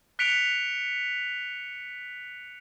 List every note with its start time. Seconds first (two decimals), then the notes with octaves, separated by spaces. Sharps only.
0.19 F#6 B6 C#7 D7 F7